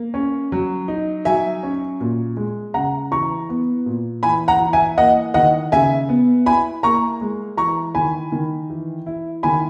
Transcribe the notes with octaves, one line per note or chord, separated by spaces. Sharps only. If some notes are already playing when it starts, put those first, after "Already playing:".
Already playing: A#3
C#4
F#3
D#4
F#3 E5 G#5
C#4
A#2
G#3
C#3 F#5 A#5
E3 A#5 C#6
B3
A#2
E3 G#5 B5
F#5 A#5
E3
E5 G#5
A#3 D#5 F#5
D#3 D#5 F#5
C#3 E5 G#5
B3
E4 G#5 B5
A#3 A#5 C#6
G#3
E3 A#5 C#6
D#3 G#5 B5
D#3
E3
E4
D#3 G#5 B5